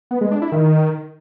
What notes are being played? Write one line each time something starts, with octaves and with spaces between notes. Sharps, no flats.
B3
G#3
D4
E4
D#3